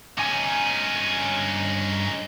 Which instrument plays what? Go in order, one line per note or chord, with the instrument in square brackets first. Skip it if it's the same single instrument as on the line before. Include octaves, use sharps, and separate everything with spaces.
[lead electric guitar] G2 G#5 [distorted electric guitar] C#4 D#4